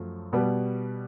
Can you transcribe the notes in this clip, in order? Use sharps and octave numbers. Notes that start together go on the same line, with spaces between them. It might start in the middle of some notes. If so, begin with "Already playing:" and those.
Already playing: F#2 F3 A3
B2 G3 B3